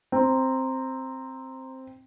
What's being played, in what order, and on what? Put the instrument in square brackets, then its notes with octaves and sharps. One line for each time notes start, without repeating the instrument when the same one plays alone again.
[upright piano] C4 [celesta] A#5 C6